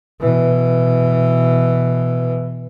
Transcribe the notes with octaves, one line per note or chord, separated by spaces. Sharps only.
B2 E3